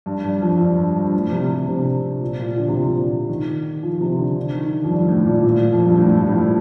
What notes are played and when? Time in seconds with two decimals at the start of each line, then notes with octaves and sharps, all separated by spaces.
0.06 G2
0.24 G2
0.42 F2
0.60 G2
0.78 G2
0.96 G2
1.14 A2
1.32 C3
1.50 C3
1.68 C3
2.22 A#2
2.39 A#2
2.57 D3
2.68 C3
2.79 A#2
2.90 C3
3.29 D#3
3.83 F3
4.01 C3
4.19 D3
4.36 D3
4.55 D#3
4.84 F2
4.91 G2
5.08 A2
5.26 A#2
5.44 A#2
5.73 F2
5.85 G2
5.98 A2
6.16 G2
6.27 A2
6.34 G2